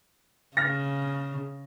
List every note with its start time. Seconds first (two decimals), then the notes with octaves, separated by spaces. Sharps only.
0.57 C#3 F6 A#6